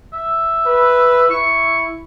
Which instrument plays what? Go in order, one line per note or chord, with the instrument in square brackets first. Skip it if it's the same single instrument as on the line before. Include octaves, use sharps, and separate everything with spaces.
[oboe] E5
[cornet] B4
[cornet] E4 [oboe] C#6